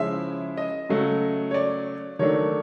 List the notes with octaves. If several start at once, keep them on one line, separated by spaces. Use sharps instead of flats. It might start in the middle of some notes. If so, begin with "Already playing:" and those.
Already playing: C#3 F3 G#3 C#4 E4 E5
D#5
C#3 F#3 A3
C#5
D5
D#3 F#3 A3 D4 C#5